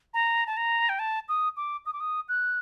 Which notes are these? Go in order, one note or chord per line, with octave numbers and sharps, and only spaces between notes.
A#5
A5
A#5
G5
A5
D#6
D6
D#6
D6
D#6
F#6